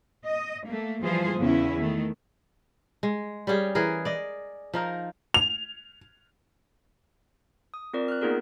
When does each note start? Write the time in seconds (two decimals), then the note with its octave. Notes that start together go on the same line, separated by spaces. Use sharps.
0.24 D#5
0.66 A3 A#3
1.02 E3 F3 G3 F4 G#4 C5
1.38 E2 C#3 C#4 E4
1.79 D#3 A3
3.03 G#3
3.47 G3 C#4 G4 G#4
3.75 E3 G#4 A#4
4.05 D5 D#5
4.74 F3 D#4 A#4
5.34 F7
7.74 D#6
7.93 C4 F4 A#4 D5
8.08 F6 F#6
8.21 A#3 B3 D#4 F4 G#4 A#4